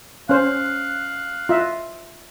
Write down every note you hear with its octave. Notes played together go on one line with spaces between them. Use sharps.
C#4 C5 F5 F#6
F4 D#5 E5